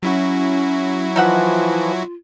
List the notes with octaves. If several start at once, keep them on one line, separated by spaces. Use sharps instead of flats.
F#3 C#4 E4 F#4
E3 F3 D#4 F4 E5 F#5